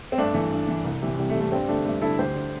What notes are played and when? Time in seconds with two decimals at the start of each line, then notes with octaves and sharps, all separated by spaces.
0.12 C4
0.18 G2 A3 D4
0.34 E3 A3
0.52 G2
0.69 E3
0.85 C2
1.02 C3 E3
1.19 C2 G3
1.30 A3
1.35 C3 E3
1.41 A3
1.52 G2 G3 C4
1.68 D3 A3 D4
1.85 G2 A3
2.02 D3 E4 A4
2.19 D2 G4 C5
2.35 D3